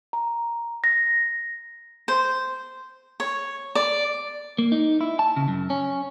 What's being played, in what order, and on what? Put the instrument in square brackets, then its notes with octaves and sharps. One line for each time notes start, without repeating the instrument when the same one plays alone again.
[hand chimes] A#5
A#6
[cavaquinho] C5
C#5
D5
[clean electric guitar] A#3
D#4
E4
A5
C#3
F#2
C#4